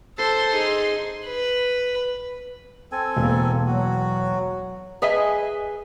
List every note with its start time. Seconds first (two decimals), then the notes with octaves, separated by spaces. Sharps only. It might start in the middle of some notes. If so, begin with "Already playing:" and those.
0.18 A4 C5 C6
0.51 D#4 G#4
1.26 B4
2.92 C4 A4 G#5
3.17 E1 A#3
3.67 F#3 F#4
5.02 G#4 B4 D#5 E5 G#5